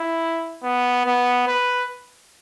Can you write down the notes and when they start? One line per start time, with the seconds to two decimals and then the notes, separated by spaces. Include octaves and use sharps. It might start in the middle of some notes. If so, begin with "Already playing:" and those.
Already playing: E4
0.63 B3
1.06 B3
1.48 B4